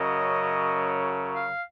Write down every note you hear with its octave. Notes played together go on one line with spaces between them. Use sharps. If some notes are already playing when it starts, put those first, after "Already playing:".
Already playing: F#2 C#3 F#3 D#5
F5